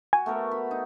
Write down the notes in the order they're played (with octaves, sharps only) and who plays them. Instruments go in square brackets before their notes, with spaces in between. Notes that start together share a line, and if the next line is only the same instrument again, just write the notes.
[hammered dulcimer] F#4 [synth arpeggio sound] G#5
[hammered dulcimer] A3 B3 A#4
B5
D#4